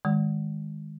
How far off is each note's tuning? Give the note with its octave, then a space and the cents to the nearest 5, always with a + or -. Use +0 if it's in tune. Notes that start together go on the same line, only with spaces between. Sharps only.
D#3 +0 G#3 -10